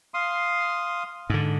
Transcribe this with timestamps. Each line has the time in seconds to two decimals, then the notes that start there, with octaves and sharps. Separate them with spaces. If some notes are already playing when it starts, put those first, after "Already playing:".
0.14 F5 C6 D#6
1.30 G#2 D3